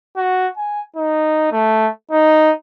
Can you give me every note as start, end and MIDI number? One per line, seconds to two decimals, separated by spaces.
0.16 0.48 66
0.57 0.81 80
0.96 1.50 63
1.52 1.89 57
2.11 2.52 63